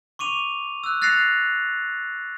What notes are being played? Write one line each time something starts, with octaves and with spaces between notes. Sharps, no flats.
C#6 D6 D#7 F7
E6 F#6
F#6 A6 A#6 C7 C#7 F7